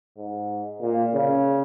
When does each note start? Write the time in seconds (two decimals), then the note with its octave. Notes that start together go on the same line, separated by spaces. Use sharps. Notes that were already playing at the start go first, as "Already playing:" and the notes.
0.17 G#2
0.82 A#2
1.14 C#3